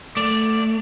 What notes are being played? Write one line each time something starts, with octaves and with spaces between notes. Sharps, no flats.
A3 D5